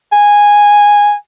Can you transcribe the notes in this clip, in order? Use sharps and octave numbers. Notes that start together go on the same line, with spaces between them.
G#5